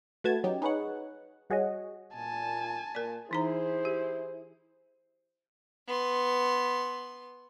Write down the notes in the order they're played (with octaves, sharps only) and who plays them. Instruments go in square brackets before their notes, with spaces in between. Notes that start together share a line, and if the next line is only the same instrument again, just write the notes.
[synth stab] A3 F#4 B4 A5 G#6
F#3 C#4 D#4 G4
D#4 G#4 B4 C#5 F#5
G3 F#4 G#4 C#5 D#5
[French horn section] A#2 [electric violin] G#5 A5
[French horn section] A#2 A#3 F4 [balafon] A#4 D5
[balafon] E3 D#4 A#5 [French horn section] E4 C5 [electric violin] G#4
[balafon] G4
[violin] B3 C6